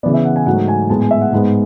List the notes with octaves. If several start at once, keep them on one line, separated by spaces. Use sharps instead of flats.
C#3 E3 B3 D5
E5
F#5
G#5
G#2 F#3 A3 F#5
G#5
A2 G#3 B3 A5
G#5
E5
F#5
G#2 G#3 B3